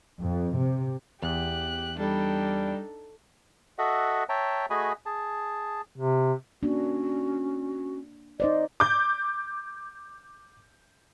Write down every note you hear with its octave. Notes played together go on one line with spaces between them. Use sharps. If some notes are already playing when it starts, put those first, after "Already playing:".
F2
C3
E2 G4 F#6
G3 D4 D#4 A4 G5
F#4 A4 D#5 E5 F#5
C#5 E5 G5 A5 A#5
A3 F#4 G#4 D#5 G#5 B5
G#4 A5
C3
A#3 C#4 D4 F#4
D#4 C5 D5 D#5
D6 G6